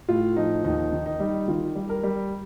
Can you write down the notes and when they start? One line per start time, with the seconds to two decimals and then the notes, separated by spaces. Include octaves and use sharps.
0.09 A2 F4
0.36 F3 D#4
0.64 D#2 D#4
0.92 D#3
1.06 D#4
1.20 G3
1.48 D#3 F4
1.76 G3
1.89 A#4
2.03 G3